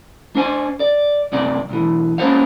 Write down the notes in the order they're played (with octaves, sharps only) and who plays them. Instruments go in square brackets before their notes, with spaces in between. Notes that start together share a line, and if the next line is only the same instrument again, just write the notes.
[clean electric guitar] D4 C5 G#5
D5
F#2 C3 D5
B1 E3
A#3 C#4 F4 C5 C#5 F5